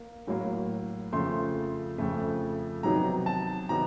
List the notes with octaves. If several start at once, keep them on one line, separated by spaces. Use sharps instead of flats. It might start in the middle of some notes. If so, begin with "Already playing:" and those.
Already playing: A#3
A2 F#3 A#3
F2 C#3 F3 A3 C6
F2 C#3 F3 A3
C3 D#3 F#3 B3 D#4 A#5
A5
C3 D#3 F#3 B3 D#4 A#5